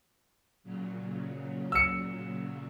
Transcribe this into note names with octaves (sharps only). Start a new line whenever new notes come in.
A#2 C#3 F#3
E6 C#7